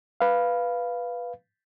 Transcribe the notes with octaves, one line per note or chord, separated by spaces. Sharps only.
B4 F5